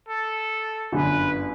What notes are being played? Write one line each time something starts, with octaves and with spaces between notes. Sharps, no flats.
A4
G1 F#2 D3 B4